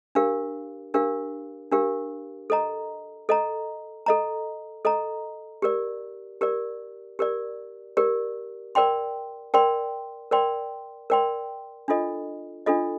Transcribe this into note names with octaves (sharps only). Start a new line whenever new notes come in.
D4 G4 A#4 F5
D4 G4 A#4 F5
D4 G4 A#4 F5
A4 D#5 A#5
A4 D#5 A#5
A4 D#5 A#5
A4 D#5 A#5
G4 A#4 D5
G4 A#4 D5
G4 A#4 D5
G4 A#4 D5
A#4 D5 G5 C6
A#4 D5 G5 C6
A#4 D5 G5 C6
A#4 D5 G5 C6
D4 F4 A4 D#5
D4 F4 A4 D#5